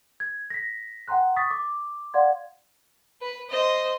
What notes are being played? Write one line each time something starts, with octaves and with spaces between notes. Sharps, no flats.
G#6
A#6 B6
F#5 G5 A#5 C6 F#6
C#6 D#6 A6 B6
D6
D5 F5 F#5 C6 G#6
B4
C5 D#5